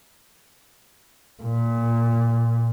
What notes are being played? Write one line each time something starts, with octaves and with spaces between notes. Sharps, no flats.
A#2